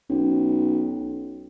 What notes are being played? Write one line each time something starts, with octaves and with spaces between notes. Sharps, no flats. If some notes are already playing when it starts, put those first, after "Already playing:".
B1 C#4